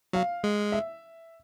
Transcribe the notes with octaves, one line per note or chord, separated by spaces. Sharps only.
F#3 F5
G#3
E5